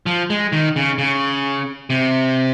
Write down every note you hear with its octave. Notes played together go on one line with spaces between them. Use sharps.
F3
G#3
D#3
C#3
C#3
C3